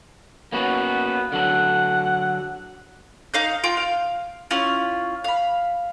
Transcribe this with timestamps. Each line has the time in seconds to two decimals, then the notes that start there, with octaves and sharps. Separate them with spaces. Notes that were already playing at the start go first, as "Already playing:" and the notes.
0.52 A#3 B3 C#4 F#4
1.32 D3 F#3 D4 F#5
3.34 D#4 F5 G6
3.64 F4 G5
3.77 F5
4.51 C#4 E4 F4
5.24 F5 B5